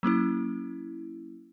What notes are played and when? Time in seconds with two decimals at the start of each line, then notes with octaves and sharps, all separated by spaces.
0.03 F#3 A#3 C#4 E4